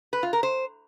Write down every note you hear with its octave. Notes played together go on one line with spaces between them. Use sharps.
B4
F4
A#4
C5